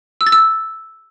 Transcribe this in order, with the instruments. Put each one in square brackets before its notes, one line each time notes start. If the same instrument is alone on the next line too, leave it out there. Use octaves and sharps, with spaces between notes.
[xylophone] E6
A6
E6